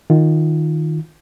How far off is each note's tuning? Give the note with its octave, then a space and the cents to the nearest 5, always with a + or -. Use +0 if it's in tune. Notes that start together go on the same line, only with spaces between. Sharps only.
D#3 +0 F4 +0